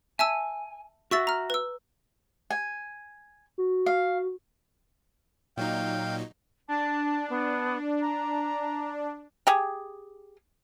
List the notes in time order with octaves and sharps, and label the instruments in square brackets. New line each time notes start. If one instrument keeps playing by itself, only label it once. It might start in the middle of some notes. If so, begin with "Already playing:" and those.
[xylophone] E5 A5 E6 [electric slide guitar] G#5
[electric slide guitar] F#4 E5 [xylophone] C#6 E6 A6
[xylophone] A#5 F6
B4 E6
[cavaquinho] G#5
[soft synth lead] F#4
[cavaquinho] F5
[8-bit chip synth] A#2 F#3 D#4 [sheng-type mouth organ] F5 G5
[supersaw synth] D4 [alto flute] A5
[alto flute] B3
A#5
[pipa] G4 G#4